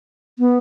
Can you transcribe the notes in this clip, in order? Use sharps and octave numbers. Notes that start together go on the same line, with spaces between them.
B3